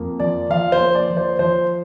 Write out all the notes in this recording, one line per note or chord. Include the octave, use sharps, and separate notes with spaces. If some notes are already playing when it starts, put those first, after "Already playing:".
Already playing: F2 A#3
F3 D5
F3 F5
C5
A#3
D5
F3
C5
F3 C5